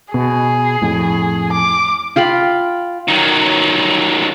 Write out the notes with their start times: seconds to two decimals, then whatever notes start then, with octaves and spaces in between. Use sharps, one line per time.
0.14 B2 G#4
0.82 F2 A2
1.53 D6
2.16 F4 F5 G5 B5
3.08 D#3 F#3